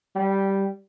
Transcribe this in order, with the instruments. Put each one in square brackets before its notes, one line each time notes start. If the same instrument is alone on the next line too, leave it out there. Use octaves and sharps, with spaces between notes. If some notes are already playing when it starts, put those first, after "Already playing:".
[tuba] G3